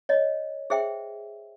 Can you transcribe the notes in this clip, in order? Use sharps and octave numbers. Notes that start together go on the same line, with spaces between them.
C#5 D#5
G#4 C5 E5 G5